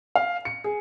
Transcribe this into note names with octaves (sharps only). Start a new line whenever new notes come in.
F5
C#7
G#4